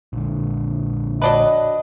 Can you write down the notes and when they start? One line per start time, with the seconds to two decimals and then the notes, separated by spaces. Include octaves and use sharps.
0.13 A#1 D3
1.22 F#3 D4 B4 D#5